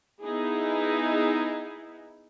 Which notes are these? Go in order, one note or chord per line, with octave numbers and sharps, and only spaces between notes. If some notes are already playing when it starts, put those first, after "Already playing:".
B3 D#4 E4 G#4